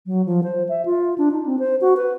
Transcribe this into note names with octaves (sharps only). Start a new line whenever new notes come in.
F#3
F3
C5
E5
F4
D4
D#4
C4
C5
F#4
B4